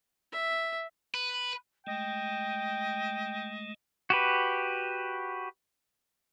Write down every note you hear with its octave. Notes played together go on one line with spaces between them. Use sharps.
E5
B4
G#3 A3 D#5 G5
F#4 G4 B4